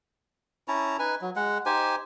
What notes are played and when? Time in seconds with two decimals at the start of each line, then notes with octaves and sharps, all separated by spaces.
0.68 C#4 E4 A5 A#5
0.99 D#4 B4 G#5
1.21 F#3
1.36 G#3 F#5
1.66 D#4 G4 C5 G#5